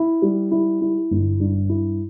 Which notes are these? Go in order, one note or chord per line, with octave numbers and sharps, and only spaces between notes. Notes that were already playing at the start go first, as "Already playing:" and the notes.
Already playing: E4
G3
E4
E4
G1
G2
E4